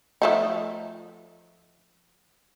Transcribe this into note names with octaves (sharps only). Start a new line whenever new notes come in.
F3 A3 D#4